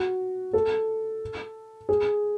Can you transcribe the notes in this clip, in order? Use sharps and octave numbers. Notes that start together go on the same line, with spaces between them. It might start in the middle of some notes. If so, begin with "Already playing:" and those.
Already playing: F#4
A4
G#4